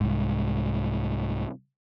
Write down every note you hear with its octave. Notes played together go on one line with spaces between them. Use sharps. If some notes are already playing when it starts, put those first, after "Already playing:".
C2 G#2